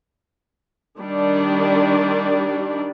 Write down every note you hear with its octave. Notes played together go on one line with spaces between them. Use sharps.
D#3 G3 D4